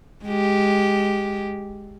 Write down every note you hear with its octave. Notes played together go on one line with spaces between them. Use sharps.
G#3 G4